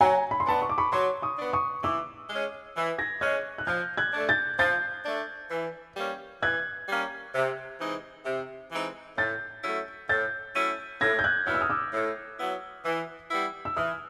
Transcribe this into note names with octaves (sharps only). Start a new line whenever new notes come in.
F#3 G#5 A#5
B5
C6
B3 D4 A5 B5
C#6
D6
B5 C#6
F#3 C6 D6
C#6 D#6
B3 D4
C#6 D#6
E3 D6 E6
G#3 C#4
E3
G#6 A#6
G#3 C#4 F#6 G#6
F#6
F3 F6 G6
F#6 G#6
A3 D4
G6 A6
F3 G6 A6
A3 D4
E3
G3 A#3 C#4
E3 F#6 G#6
G3 A#3 C#4
C3
E3 G#3 C4 D#4
C3
E3 G#3 C4 D#4
A2 G6 A6
F#3 A3 C#4 E4
A2 G6 A6
F#3 A3 C#4 E4
A2 G#6 A#6
G6
F#6 G#6
F#3 B3 E4 F6
E6
D#6 F6
D6 E6
A2
F#3 B3 E4
E3
G3 B3 E4
E6
E3 D#6 F6